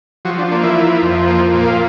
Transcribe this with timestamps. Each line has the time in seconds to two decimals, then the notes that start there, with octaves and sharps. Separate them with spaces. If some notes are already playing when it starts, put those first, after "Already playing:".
0.25 F3 F#3 F#4
0.38 D4
0.51 A#3 D4
0.63 E3 E4
0.77 F3
1.02 F2
1.27 A#3
1.53 A#2
1.66 F4